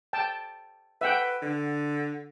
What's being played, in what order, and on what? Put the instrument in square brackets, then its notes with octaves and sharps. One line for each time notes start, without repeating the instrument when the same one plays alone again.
[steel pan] G5 A5
[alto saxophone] B4 [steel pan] E5 F#5 G5
[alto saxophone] D3